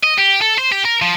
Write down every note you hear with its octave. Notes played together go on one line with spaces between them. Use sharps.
D#5
G4
A4
C5
G4
A#4
F3